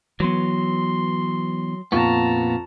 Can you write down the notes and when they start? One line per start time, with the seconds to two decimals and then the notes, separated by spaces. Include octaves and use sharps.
0.20 E3 F#3 B3 C6
1.92 F2 A#2 B3 F4 A5 A#5 C#6